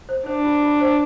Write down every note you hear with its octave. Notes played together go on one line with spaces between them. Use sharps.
C5
D4 C5
F4
F4
C5